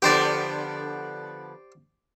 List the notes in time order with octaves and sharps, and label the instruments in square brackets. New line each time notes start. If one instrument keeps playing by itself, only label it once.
[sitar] D3 F3 B3 [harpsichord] G4 C5 D5